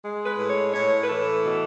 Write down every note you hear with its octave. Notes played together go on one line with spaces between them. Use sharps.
G#3
B4
A2
C#5
A2 C#5
B4
E3 A4
B2